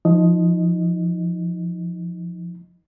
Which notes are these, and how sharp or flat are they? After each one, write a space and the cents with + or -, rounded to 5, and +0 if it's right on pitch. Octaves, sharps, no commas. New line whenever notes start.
F3 +0 D#4 +25 D#5 +0